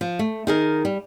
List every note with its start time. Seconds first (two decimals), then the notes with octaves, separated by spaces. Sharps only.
0.01 F3
0.19 A3
0.47 D#3 G#4 A#4
0.85 G3